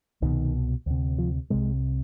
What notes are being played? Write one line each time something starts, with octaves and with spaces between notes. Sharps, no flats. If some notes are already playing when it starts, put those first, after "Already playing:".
C2 B2 D#3
D2 C3
F3
C2 C3 G#3